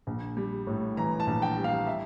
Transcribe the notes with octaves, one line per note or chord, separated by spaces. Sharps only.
A#1
G3
A2
E3 A#5
A5
A#1
G5
G3
F5
E5